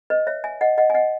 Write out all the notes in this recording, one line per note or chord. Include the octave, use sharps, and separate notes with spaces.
B4 D#5
C#5 E5
E5 G#5
D#5 F#5
D#5 F#5
G#5
D#5 F#5